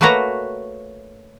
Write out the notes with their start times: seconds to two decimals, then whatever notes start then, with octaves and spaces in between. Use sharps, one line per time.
0.01 A3 A#3 F#4 B4 C#5 A#5